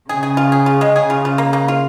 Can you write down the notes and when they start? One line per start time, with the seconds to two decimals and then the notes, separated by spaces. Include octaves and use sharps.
0.09 C#3 G#4
0.23 G#4
0.37 F4
0.52 G#4
0.66 F4
0.81 G#3
0.96 G#4
1.10 F4
1.25 F4
1.38 A#3
1.53 A#3
1.68 F4